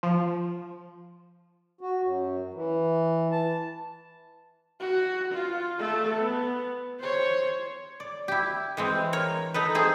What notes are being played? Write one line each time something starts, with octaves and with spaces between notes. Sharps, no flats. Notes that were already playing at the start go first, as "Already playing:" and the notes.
F3
F#4
F#2
E3
A5
F#4
F4
A3 A4
B3
C5 C#5
D5
E4 G4
E3 G#3 C4
A#4 C#5
D#4 A4 B4
A3 C4 G#4